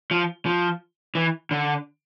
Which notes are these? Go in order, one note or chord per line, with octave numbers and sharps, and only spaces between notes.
F3
F3
E3
D3